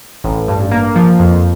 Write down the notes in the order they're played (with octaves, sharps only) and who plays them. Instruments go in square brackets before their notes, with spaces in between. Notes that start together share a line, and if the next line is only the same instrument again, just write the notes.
[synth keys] A1
G2
A#3
F3
F2